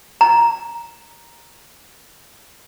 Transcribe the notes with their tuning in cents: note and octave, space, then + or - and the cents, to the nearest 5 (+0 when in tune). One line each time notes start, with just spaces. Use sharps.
A#5 +5